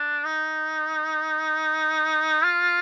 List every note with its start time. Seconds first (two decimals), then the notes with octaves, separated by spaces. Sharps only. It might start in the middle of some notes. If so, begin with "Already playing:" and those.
Already playing: D4
0.25 D#4
2.44 F4